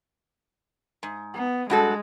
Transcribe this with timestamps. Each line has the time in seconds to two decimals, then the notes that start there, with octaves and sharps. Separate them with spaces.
1.03 G#2
1.34 B3
1.70 G2 G#3 F#4 A4